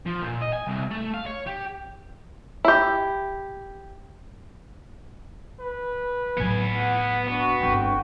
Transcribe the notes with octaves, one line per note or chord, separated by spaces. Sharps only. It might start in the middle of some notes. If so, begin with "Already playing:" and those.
F3
A#2
D#5
G#5
C2
A3
F5
C#5
G4
E4 G4
B4
A2 F#3 B3 G#5
F#5
B3 D4 F#4
G1 C4 G5